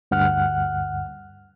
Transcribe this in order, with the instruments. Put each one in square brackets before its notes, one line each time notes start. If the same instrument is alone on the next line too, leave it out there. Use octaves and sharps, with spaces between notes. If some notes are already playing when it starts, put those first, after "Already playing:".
[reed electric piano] D2 G2 F#5 F6 F#6